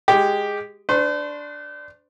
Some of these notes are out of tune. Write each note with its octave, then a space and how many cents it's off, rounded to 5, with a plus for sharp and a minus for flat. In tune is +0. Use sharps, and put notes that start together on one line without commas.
G#3 -10 G4 +0
D4 +0 C5 -40 C6 +40